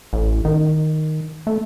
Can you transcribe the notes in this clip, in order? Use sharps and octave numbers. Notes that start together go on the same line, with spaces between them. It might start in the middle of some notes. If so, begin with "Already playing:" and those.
A1
D#3
A3